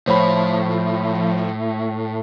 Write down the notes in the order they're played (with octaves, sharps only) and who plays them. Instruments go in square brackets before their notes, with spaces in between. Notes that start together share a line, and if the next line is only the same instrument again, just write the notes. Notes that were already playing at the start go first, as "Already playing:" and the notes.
[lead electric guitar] A2 [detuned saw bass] F3 [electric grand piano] C5 C#5 B5